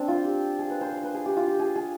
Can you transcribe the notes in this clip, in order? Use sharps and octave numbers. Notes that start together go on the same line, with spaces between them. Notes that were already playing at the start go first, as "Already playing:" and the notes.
Already playing: C4 D4
F4
G4
G#4
B4
C5
C5
B4
G#4
G4
F4
G4
G#4
G#4